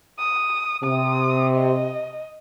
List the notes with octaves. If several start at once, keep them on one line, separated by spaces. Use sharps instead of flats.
D#6
C3 D#6
D#5